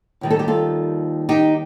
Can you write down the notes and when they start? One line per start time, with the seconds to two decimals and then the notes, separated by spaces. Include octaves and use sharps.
0.21 D#2 D#3 G3
0.30 A4
0.39 G4
0.48 F4 A4
1.29 D#4 G4